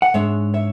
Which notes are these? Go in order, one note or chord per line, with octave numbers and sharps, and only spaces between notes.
F#5
G#2 G#3 D4 C#5 E5
C#5 E5